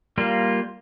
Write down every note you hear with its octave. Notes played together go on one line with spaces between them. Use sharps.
G3 A#3 F4